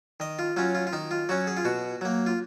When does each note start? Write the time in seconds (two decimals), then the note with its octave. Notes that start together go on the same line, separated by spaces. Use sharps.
0.20 D#3 D#5
0.39 F4
0.56 F#3 C#4 F4
0.75 F4
0.87 F4
0.93 D#3 D#4
1.11 F4
1.29 F#3 C#4 F#4
1.47 G#4
1.57 F4
1.65 B2 F#4
2.01 F#3 A#3
2.26 F4